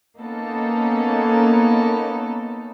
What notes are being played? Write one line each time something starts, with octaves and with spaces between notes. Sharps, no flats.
A#3 B3 C#4 D#4 A4